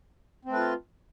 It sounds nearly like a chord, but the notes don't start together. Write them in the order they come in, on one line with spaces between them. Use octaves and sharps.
C4 A3 B4 F4